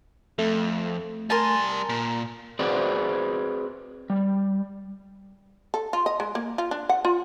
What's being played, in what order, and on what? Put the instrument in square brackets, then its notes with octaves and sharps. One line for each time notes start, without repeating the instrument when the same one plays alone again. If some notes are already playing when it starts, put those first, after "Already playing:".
[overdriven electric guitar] F2 [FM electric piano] A3
[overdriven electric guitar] G3 C6 [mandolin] A#4 G#5 A5
[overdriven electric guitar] A#2
[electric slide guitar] C4 F#4 G#4 B4 C5 D5
G3
[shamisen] A4
F4
D#5
G#3
A#3
F4
D4
F#5
F4